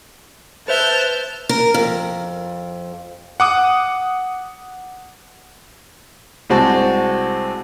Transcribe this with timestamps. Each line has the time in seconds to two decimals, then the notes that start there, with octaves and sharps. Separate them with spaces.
0.68 B4 C5 E5 A5 F6 G6
1.49 A#4
1.74 F2
3.40 F#5 D6 D#6
6.50 C2 G#3 C4 F#4 A5